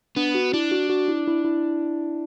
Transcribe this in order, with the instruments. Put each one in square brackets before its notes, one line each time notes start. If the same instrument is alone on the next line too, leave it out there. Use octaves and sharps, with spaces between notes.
[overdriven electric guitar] B3 [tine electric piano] D4
[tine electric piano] F#4
[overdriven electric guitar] D4 [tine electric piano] E4
[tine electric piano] F#4
F#4
E4
E4
E4